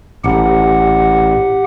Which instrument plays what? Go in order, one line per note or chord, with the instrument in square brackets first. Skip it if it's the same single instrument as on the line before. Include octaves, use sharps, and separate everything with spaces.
[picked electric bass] A1 [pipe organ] G4 F#5